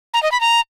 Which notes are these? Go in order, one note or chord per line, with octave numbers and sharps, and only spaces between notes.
A#5
D#5
B5
A#5